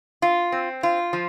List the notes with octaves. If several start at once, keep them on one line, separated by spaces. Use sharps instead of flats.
F4
C4
F4
F3